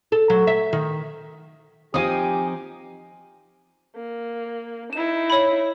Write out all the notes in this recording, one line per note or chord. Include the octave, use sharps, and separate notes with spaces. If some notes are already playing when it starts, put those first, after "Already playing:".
A4
F#3
E5
D#3
F3 C4 D#4 G4 G#5 D6 D#6
A#3
D#4 E4 E7
C#5 B5